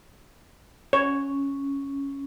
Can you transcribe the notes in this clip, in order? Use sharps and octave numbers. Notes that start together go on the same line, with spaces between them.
C#4 C#5